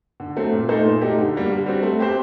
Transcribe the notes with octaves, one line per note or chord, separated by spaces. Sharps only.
D3
F#3 A3 C4
A#2
A3 D#4 A4 C5
A#2
F#3 A3 D#4 G4
D3
G3 A#3 F#4
D3
G3 C4 F#4
A3
C4 G4 C5